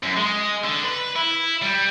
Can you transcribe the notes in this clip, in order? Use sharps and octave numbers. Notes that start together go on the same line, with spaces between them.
F#2
G#3
D3
B4
E4
G3